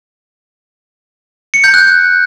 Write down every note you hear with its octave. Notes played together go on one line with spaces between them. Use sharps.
C#7
G6
F#6